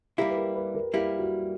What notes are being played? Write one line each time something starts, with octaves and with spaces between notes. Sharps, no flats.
G3 A#3 E4 G4
B4
A#4
B4
A#4
G3 A#3 E4 G4
F#4